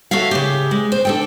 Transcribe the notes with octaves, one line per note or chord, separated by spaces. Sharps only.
F#4 A4 C#5 E5 F5
C#3 G4
G#3
C5
D4 A4 G5